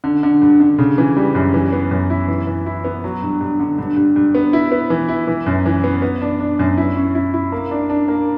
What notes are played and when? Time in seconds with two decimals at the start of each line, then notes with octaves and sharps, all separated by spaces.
0.04 D3
0.23 D3
0.42 G2
0.60 D3
0.79 C#3
0.98 E3
1.17 G3
1.35 F#2
1.54 E3
1.73 B3
1.91 F#2
2.10 E4
2.28 E3
2.47 E3
2.66 E4
2.84 B3
3.04 F#3
3.22 G2
3.40 G2
3.60 D3
3.78 G2
3.96 G2
4.16 G2
4.35 B3
4.53 E4
4.72 B3
4.90 E3
5.09 E4
5.28 E3
5.46 F#2
5.66 E3
5.84 B3
6.02 B3
6.22 D4
6.40 D4
6.59 F#2
6.77 E4
6.96 C#4
7.15 E4
7.34 E4
7.52 A#3
7.71 D4
7.90 D4
8.08 A#3